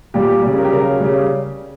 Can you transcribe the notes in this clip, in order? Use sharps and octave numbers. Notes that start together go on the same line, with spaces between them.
A#2 G3 G4
C#3 G3
A#4
G4
C#3 F#3 A#4
C#3 G3 C#4